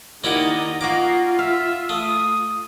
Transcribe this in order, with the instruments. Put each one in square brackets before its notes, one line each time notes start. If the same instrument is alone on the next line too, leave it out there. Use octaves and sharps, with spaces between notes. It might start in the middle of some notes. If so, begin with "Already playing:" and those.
[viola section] D#3 D#5 [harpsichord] A#3 E4 G4 [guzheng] D5 F#5
[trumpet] A#3 [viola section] F4 [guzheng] F#4 D#5 [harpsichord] D6
[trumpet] E5 [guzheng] F5
[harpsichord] A3 [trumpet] D#6